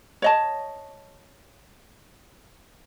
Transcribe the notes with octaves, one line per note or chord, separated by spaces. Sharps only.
C#5 D#5 A5